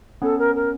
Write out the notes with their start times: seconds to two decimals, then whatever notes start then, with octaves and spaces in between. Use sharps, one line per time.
0.22 B3 C#4 A4
0.38 A#4
0.55 A#4